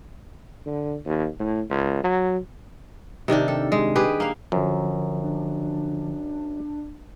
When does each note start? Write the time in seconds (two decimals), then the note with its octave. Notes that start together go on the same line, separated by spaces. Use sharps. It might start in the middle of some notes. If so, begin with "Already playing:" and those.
0.66 D3
1.06 D#2
1.40 A2
1.70 C#2
2.04 F#3
3.28 C3 D#3 D4 G4
3.48 A4
3.72 G#3
3.96 G4 G#4 B4
4.20 A#3 F5
4.52 F#2 D3 F3
5.22 D4